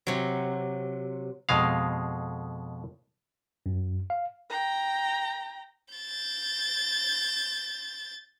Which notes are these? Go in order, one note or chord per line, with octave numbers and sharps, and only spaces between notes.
C3 F#3
F2 B2 G#3 F5
F#2
F5
G5 A#5
G6 A6